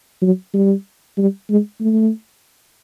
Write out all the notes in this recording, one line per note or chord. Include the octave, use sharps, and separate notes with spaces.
F#3
G3
G3
G#3
A3